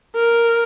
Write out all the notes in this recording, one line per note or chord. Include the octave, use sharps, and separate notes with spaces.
A#4